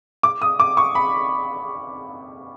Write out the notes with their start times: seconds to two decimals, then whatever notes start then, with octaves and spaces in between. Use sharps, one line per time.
0.23 D6
0.42 D#6
0.60 D6
0.77 C#6
0.95 B5